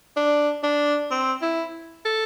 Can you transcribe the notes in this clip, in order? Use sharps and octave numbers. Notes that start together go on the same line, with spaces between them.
D4
D4
C4
E4
A4